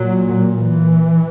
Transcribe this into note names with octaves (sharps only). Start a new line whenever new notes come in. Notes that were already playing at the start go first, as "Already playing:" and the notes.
Already playing: A#2 F#3
E3